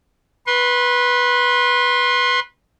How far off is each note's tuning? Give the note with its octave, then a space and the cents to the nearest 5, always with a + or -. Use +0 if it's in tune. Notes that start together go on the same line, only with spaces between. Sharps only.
B4 -10 C6 +25